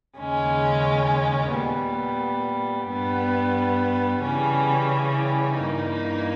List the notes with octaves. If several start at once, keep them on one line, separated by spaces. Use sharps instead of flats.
D#2 C#3 G#3 C#4
A#2 G3 B3
G2 G3 B3
C#3 E3 G3 C#4
G2 E3 A#3 D#4